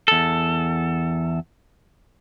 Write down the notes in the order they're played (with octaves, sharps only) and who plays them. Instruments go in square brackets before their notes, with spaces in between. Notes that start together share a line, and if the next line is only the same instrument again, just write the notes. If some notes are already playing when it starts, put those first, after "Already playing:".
[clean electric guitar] E2 A4